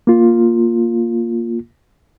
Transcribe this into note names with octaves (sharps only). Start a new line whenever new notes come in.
A#3 F4